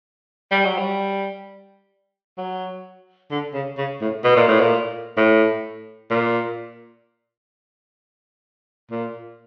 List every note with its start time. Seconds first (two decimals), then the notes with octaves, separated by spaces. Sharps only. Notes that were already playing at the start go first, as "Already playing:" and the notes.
0.51 G3
0.65 F#3
0.78 G3
2.38 F#3
3.31 D3
3.54 C#3
3.78 C#3
4.01 A2
4.24 B2
4.36 A#2
4.48 A2
4.60 A#2
5.17 A2
6.10 A#2
8.91 A#2